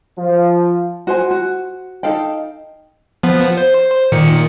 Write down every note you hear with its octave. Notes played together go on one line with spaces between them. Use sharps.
F3
F#4 C5 G#5
F#4
D#4 A4 F5 G5
F3 B3
C5
A#2 D#3 C#7